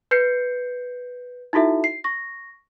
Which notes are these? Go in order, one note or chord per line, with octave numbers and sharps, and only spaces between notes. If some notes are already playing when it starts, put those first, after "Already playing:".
B4 G6 C7 C#7
D#4 E4 F#4 A4 E5
C7
C#6 A#6